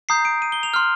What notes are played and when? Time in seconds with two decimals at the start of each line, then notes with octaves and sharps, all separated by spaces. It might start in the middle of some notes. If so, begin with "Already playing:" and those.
0.09 A#5 D#6 G6 C7
0.25 D7
0.42 D#7
0.52 G7
0.63 F7
0.74 C6 F6